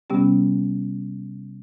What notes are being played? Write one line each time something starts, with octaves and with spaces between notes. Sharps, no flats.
C3 G3 B3 C#4 G4